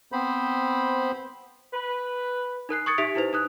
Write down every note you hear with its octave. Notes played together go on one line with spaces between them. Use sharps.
B3 C4 C5 B5
B4
D#4 A#4 F#6 C7
C#6 D#6 G#6 A6 C#7
D#4 G4 E5 B6 D7 F7
D#4 E4 B4 C5 F7
D#4 D#6 F#6